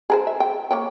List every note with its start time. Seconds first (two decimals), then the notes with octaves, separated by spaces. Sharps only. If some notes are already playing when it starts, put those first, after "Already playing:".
0.10 G#4 A#4 C5
0.27 E5
0.40 G5
0.71 A#3 C#5 G5